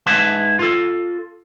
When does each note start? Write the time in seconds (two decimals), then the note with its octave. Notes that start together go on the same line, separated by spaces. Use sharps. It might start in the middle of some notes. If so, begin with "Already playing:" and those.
0.06 G#2 E4 B4 A5 C6
0.59 F4 A4